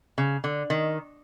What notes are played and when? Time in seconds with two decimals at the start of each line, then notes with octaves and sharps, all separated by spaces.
0.18 C#3
0.44 D3
0.70 D#3